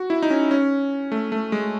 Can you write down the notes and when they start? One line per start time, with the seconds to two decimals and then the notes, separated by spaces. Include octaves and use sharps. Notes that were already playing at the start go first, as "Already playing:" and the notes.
Already playing: F#4
0.10 E4
0.22 D#4
0.30 C#4
0.51 C#4
1.12 A3
1.32 A3
1.52 G#3